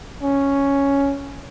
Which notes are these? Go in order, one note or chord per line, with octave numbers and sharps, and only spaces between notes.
C#4